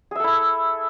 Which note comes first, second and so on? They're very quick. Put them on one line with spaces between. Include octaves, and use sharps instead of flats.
G#4 E5 A4 E4